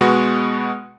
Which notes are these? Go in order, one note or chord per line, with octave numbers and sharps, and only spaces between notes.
B2 G#3 B3 F#4